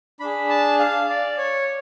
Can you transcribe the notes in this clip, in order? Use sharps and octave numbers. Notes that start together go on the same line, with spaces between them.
D4 G#4 B5
A5
F5
D5
C#5